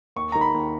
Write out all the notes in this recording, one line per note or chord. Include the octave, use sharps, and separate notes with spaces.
D#2 C#6
D#3 A#5
B5
D#2